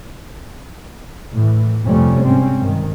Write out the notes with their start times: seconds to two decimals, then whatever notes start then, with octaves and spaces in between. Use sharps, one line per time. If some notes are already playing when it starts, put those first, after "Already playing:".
1.35 A2 E3
1.84 F2 C3 G3 A3 C#4
2.23 G#2 C4 C#4
2.59 G2 D#3